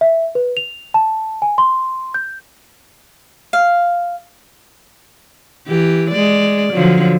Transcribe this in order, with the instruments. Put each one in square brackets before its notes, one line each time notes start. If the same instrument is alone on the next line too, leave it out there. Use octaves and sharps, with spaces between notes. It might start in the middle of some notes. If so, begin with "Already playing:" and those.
[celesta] E5
B4
F7
A5
G#5
C6
G6
[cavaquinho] F5
[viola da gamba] E3 G4
G#3 D5
D3 F3 F#3